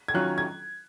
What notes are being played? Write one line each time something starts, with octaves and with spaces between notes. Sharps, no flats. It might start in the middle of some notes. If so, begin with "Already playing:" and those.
G#6
D#3 F#3 C#4 F4 F#6
G#6